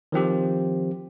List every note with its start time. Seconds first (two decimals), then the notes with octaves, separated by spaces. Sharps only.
0.12 D#3 F3 C4 G4